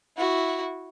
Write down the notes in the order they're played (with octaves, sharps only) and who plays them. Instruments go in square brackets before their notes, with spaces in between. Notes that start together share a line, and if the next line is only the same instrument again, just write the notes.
[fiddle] E4 F#4